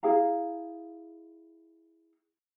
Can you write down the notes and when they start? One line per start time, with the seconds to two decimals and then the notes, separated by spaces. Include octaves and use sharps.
0.03 E4 G#4 F5 A#5